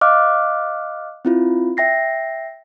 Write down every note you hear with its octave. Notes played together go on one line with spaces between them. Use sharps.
D#5 F5 D6 F6 F#6
C4 E4 F4
E5 G5 A#6 C7